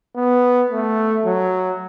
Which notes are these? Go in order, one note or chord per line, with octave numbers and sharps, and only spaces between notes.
B3
A3
F#3